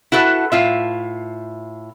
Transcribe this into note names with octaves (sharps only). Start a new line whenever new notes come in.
E4 F#4 A4 B4 F#5
A2 F4 E5